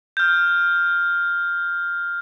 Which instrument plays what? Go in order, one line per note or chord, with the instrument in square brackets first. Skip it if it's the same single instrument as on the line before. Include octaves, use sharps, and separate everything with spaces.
[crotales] F6 G6